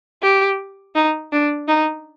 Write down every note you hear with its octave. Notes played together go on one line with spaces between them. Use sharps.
G4
D#4
D4
D#4